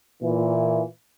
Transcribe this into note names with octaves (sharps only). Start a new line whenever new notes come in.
A#2 E3